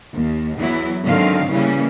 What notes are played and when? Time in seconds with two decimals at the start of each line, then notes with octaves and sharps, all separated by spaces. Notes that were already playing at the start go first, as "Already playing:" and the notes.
0.15 D#2
0.59 E2 E3 F#3 B3 E4
1.04 G#2 D3 D#3 F#3 C4 F5
1.49 C#3 E3 G3 A#3 C#4